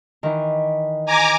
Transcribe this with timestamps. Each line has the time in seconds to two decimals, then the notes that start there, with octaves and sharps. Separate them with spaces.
0.23 D#3 E3
1.06 G#5 A#5 D6